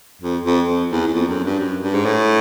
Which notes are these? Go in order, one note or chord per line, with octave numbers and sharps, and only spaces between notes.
F2
F2
F2
E2
E2
F2
F#2
G2
F#2
G2
G#2
A2